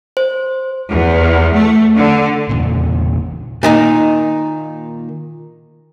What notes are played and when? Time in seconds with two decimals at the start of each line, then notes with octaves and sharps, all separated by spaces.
0.17 C5
0.90 E2
1.54 A3
1.96 D3
2.49 E2 A#2 C#3
3.63 A#2 D#3 D#4